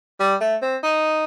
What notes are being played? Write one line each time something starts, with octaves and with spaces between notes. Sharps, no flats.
G3
A3
C4
D#4